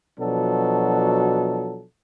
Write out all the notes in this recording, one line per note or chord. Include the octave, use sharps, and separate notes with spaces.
B2 F3 F#3 D4 A4